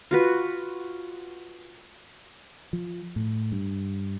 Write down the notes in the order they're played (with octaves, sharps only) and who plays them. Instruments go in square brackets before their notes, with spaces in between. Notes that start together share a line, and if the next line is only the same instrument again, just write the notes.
[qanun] F4 F#4 B4
[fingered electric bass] F3
A2
G2